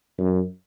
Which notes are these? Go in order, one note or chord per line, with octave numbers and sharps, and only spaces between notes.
F#2